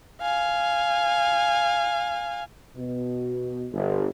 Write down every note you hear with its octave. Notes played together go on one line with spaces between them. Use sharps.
F5 G#5
B2
G1